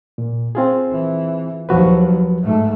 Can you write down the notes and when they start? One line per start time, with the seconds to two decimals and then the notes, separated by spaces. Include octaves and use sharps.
0.18 A#2
0.55 C4 F4 G#4
0.91 E3
1.69 D#2 F3 F#3 F#4 B4
2.42 G#2 A3